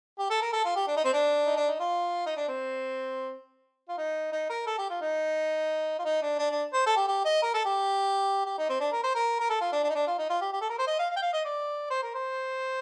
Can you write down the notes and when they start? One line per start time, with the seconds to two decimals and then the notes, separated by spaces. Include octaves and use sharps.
0.19 G4
0.30 A4
0.41 A#4
0.53 A4
0.64 F4
0.76 G4
0.88 D4
0.97 D#4
1.05 C4
1.13 D4
1.46 D#4
1.56 D4
1.68 D#4
1.79 F4
2.26 D#4
2.37 D4
2.48 C4
3.88 F4
3.98 D#4
4.32 D#4
4.49 A#4
4.67 A4
4.78 G4
4.90 F4
5.01 D#4
5.99 F4
6.05 D#4
6.22 D4
6.39 D4
6.51 D4
6.73 C5
6.86 A4
6.96 G4
7.08 G4
7.25 D#5
7.42 A#4
7.54 A4
7.65 G4
8.46 G4
8.58 D#4
8.69 C4
8.80 D4
8.92 A#4
9.03 C5
9.15 A#4
9.40 A#4
9.49 A4
9.61 F4
9.72 D4
9.84 D4
9.89 D#4
9.95 D4
10.07 F4
10.18 D#4
10.29 F4
10.41 G4
10.53 G4
10.61 A4
10.70 A#4
10.78 C5
10.87 D#5
10.99 F5
11.10 F5
11.16 G5
11.22 F5
11.33 D#5
11.45 D5
11.90 C5
12.03 A#4
12.14 C5